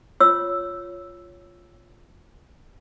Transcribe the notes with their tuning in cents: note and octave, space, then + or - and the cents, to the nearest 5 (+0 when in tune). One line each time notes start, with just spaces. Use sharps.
F4 +0 C#5 +0 E6 +0